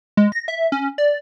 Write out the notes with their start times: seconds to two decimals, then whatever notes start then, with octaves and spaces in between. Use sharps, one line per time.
0.17 G#3
0.32 A#6
0.48 E5
0.72 C#4
0.98 D5